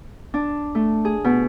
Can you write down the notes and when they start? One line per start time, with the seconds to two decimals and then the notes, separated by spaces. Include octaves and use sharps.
0.34 D4
0.75 A3
1.05 G#4
1.24 B2